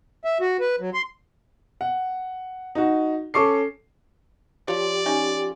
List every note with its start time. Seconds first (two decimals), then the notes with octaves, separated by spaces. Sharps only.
0.25 E5
0.41 F#4
0.60 B4
0.80 F#3
0.94 C6
1.81 F#5
2.75 D#4 F#4
3.34 C#4 A4 C#6 D6 C7
4.68 F3 G4 C#5 D5
5.06 C#4 D#4 G#5